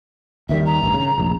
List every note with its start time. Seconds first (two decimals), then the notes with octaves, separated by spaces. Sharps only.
0.49 D#2 D#3 G3 E5
0.66 A#5
0.82 A1 G2
0.94 C#3
1.18 F1 A#1